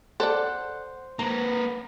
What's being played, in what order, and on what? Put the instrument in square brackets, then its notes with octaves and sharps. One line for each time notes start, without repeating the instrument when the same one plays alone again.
[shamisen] A4 D5 [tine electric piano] C5 [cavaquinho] F#5
[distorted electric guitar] A#3 B4 [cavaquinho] A#5